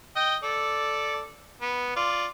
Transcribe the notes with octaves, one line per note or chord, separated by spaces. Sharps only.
D#5 G5
A4 D5
B3
F4 D5